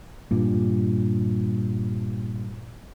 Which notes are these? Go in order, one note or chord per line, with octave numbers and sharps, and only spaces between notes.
G2 A#2